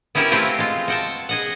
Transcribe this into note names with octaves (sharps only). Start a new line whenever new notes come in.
B3 C#4 E4 G4 A#4 E5
A3 C4 F4 G4 B4
G#3 F4
F#4 G5 A5
G#4 D#5 F#5